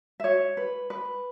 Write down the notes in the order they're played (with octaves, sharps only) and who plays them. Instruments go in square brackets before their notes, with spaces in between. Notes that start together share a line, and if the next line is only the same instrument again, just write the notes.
[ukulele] E5
F#4 C#5
B4
B4